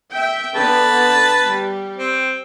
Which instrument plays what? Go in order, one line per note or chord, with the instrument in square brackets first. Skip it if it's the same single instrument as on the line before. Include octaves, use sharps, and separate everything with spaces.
[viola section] E5 G5
[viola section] D3 B3 [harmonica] B4 A5
[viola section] G3
[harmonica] C4